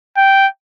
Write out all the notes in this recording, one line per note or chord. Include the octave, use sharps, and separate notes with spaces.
G5